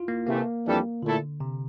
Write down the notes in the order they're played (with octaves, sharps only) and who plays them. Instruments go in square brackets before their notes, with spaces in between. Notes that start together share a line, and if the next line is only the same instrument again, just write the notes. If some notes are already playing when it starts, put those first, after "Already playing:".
Already playing: [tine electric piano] E4 F4
A#3
[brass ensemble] C3 E3 A3 [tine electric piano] A#3
[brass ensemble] F2 E3 G3 D4 A4
[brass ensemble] A#2 A3 E4 A4 [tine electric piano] D3
[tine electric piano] C3